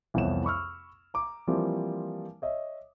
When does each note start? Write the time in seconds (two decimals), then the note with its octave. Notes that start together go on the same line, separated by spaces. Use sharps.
0.14 C2 F2 E3 B3 C#5 E7
0.44 B5 C#6 E6 F6
1.14 A#5 D6
1.47 E3 F3 G3 A#3 C4
2.42 C#5 D#5 E5